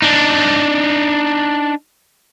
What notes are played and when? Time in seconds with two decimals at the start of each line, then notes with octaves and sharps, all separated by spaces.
0.02 D4 D#4